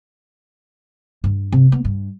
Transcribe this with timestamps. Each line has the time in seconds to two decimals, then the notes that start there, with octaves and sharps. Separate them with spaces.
1.24 G2
1.52 C3
1.72 B3
1.85 G2